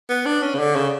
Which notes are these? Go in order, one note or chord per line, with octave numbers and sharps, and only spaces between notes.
B3
D4
C#4
C#3
D3
C#3